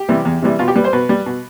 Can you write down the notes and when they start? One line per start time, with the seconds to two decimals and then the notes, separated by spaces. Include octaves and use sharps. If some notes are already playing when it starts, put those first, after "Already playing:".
Already playing: G4
0.09 C3 E3 G3
0.25 E2
0.42 C3 E3 G3
0.59 B2 F4
0.68 G4
0.76 G3 B4
0.84 C5
0.93 B2 B4
1.09 G3
1.26 B2